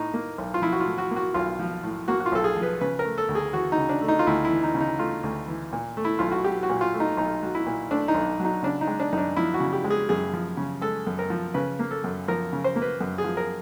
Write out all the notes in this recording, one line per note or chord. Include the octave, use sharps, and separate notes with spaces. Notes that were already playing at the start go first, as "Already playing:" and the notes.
Already playing: A2 D#4
A#3
B1
F4
F3 E4
F#4
F4
A2
F#4
A#3 F#4
B1 F4
F3
A2
A#3 F#4
F#4
F4
B1 A4
G#4
F3
B4
C#3 B4
A#4
A3
A4
D2
G#4
E3 F#4
D#4
C#3
D4
A3
D#4
F4
D2 E4
E4
E3
D#4
C#3
D#4
A3 F4
D2
E3
A#2
A3
E4
B1 F4
F#4
F#3 G4
F#4
A#2
F4
A3
D#4
B1 D#4
F#3
E4
A#2
A3 D4
D#4
B1
F#3
D#4
C#3 D4
D#4
G#3
D4
F#2 D#4
D4
F3 E4
F#4
C#3
G4
G#3
G#4
F#2 G#4
F3
C#3
G#3 A4
F#2
A#4
F3
C#3 B4
A#3
A4
F#2
F3 A#4
C#3
C5
A#3
B4
F#2
G#4
F3
A#4